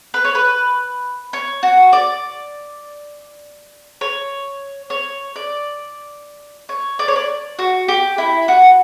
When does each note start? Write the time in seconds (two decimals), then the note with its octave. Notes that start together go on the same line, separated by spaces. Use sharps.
0.14 B4
0.25 C#5
0.35 B4
1.33 C#5
1.63 F#4
1.93 D5
4.01 C#5
4.90 C#5
5.36 D5
6.69 C#5
6.99 D5
7.08 C#5
7.16 D5
7.59 F#4
7.88 G4
8.18 E4
8.48 F#4